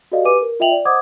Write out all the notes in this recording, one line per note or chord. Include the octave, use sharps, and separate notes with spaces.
F#4 G4 A4 D5 D#5 F5
G4 B4 G#5 D6 D#7
A#4
F4 D#5 E5 G5 F7 F#7
D5
C5 D#5 F#5 D6 D#6 G#6